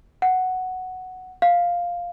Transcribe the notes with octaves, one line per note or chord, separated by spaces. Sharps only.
F#5
F5